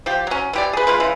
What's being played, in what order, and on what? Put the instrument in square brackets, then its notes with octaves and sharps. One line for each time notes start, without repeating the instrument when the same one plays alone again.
[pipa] F3 G4
F#3 C#4
E3 G4 D5
G#4 B4
G#3 F4 B4
C#3 E3